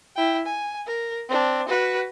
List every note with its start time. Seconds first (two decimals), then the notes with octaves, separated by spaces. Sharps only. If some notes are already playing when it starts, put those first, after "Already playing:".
0.16 E4 G5
0.46 G#5
0.86 A#4
1.29 C4 D4
1.68 F#4 B4